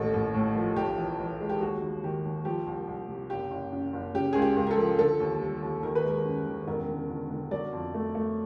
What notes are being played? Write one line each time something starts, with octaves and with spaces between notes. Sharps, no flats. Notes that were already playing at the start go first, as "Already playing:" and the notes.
Already playing: A1 D#2 A4
A1
A2
F3
B1 G4
E3
E3
G#3
G4
D#2 F#4
D#2
D#3 G4
D#2
F3 G4
C2
C2
C3
F#1 G4
F#1
F#2
F#1
C#3 G4
C#2 G#4
G4
C#2
A#4
A4
F3
D3 A4
D#2
G3
D#2
D#3 A#4
B4
G#3 A#4
F#2
D#3
E1 A#4
D3
D3
D3
F#3 D5
F2
A3
A3